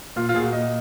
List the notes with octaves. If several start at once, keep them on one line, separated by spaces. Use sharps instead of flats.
A#2 F4
F4
A#2 G#4
F#4
A#2 D#5